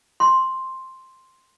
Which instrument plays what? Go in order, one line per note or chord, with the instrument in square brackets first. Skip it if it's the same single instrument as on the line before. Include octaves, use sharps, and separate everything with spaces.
[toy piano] C6